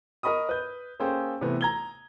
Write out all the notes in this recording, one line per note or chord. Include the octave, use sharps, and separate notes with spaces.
A#4 D#5 B5 C#6 D#6
B4 G6
A#3 C#4 G#4 A4 C5 G5
C3 E3 A3 B3
A#5 G#6 G7